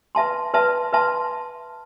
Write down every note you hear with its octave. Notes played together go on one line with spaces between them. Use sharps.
B4 E5 A5 C6
B4 E5 A5 C6
B4 E5 A5 C6